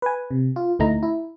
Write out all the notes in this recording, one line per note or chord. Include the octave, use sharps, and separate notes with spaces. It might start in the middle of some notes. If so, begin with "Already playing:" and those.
B4 G#5
C3
F4
D2 A#2 A3 D#4 E4 A#5
E4